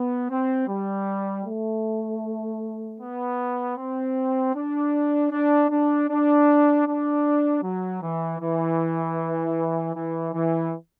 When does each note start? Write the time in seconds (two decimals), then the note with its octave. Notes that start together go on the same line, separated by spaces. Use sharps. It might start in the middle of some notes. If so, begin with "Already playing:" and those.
Already playing: B3
0.30 C4
0.68 G3
1.46 A3
3.00 B3
3.77 C4
4.55 D4
5.32 D4
5.70 D4
6.09 D4
6.86 D4
7.63 F#3
8.02 E3
8.40 E3
9.95 E3
10.33 E3